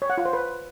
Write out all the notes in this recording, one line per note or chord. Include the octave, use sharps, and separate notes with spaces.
C#5
F#5
F4
C5
B4